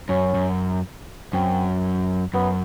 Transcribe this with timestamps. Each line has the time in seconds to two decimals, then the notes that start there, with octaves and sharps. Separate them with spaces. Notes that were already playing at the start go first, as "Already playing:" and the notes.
0.09 F#2 C#4
0.35 F#2
1.33 F#2 C4
2.34 F#2 B3